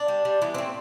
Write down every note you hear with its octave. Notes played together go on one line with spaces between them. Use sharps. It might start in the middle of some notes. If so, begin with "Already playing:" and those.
Already playing: D4
G3
G3
E3 B3
A2 C4